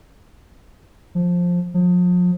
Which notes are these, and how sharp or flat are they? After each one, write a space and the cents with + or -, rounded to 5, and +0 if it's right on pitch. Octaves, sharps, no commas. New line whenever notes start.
F3 +10
F3 +40